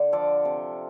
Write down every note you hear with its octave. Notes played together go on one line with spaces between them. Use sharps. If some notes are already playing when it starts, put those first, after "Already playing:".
Already playing: D3
F3 A4 D5
C3